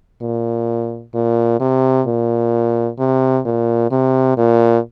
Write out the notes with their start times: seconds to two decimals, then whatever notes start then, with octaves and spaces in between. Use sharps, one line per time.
0.22 A#2
1.14 A#2
1.60 C3
2.07 A#2
2.99 C3
3.46 A#2
3.91 C3
4.37 A#2